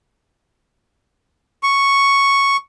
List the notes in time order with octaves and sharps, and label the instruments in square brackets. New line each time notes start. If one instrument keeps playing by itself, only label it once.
[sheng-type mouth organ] C#6